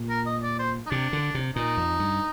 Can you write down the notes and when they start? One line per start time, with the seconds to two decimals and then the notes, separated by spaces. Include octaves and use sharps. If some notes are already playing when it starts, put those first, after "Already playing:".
Already playing: A#2
0.10 A#4
0.26 D#5
0.43 D5
0.59 C5
0.87 D#4
0.90 C3 D4
1.13 D3
1.35 C3
1.56 A#2 D#4
1.77 F2
1.99 G2